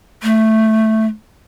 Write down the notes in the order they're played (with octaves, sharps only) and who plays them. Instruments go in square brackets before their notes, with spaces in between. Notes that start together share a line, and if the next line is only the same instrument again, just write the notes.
[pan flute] A3